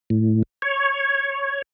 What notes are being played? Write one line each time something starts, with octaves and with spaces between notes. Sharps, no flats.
A2
C#5